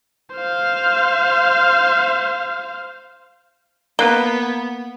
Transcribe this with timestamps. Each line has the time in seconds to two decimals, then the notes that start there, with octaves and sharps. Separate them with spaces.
0.35 C5 F5
3.99 A#3 B3 A#5 F#6 G7